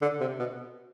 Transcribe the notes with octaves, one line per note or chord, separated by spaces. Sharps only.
D3
C3
B2